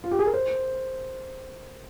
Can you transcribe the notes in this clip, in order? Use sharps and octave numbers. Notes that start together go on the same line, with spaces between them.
F4
G4
G#4
A#4
C5